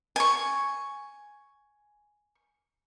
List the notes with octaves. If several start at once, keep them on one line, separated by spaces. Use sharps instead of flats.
G#5 C#6